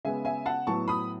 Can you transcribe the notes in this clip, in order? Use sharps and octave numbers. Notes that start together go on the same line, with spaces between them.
C#3 G#3 B3 E5 G#5
E5 G#5
F#5 A5
A2 F#3 B3 A5 C#6
B5 D#6